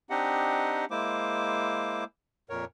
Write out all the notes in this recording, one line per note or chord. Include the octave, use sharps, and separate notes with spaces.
C4 D4 D#4 G4 D#5 F#5
G#3 A#3 E4 C5 D6
F2 A#2 A#4 C#5